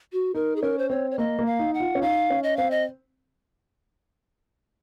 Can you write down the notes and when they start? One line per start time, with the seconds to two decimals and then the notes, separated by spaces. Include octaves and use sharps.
0.13 F#4
0.34 D#4 A#4
0.56 G#4
0.62 C#4 A#4
0.78 C5
0.90 C4 C#5
1.11 C#5
1.18 A#3 D#5
1.39 A#3
1.46 F5
1.59 D#4
1.74 F#5
1.80 F4
1.95 C#4
2.02 D#4 F5
2.30 C#4
2.43 D#5
2.57 C4 F5
2.71 D#5